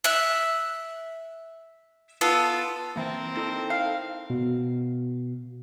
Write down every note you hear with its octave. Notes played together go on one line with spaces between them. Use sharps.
E5 F#6
B3 F4 A4
E3 A#3 C4 A#4
D#4 E4 A4
F5
B2